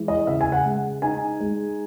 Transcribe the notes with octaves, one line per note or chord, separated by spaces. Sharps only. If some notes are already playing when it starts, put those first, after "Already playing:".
Already playing: E3 G#3
D#5
C#3 E5
G#5
F#5
G#3
D#4 G#5
G#3